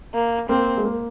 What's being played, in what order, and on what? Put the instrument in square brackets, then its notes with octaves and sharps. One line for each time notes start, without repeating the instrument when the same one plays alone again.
[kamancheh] A#3
[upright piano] A#3 [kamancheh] C4
[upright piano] G#3
A#3